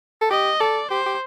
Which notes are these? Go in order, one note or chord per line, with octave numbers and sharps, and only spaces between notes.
A4
G4 D#5
A4 D5
G4 C5
G4